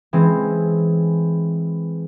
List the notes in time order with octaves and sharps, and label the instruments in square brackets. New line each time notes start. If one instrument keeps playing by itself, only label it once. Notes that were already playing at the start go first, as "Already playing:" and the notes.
[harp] E3 G#3 C4